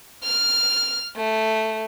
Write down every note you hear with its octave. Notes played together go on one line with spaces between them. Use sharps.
F6
A3